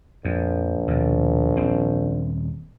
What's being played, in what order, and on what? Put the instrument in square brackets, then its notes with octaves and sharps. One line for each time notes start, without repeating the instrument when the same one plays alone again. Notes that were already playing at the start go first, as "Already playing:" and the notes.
[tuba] A#1 [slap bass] F2
[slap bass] D#2 B2
D#1 C4